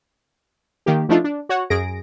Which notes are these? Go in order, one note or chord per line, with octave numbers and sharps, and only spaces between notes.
D#3 A#3 G4
F3 A3 D4 D#4 F4
D4
F#4 C#5 F#5
F#2 G#4 A#6 D7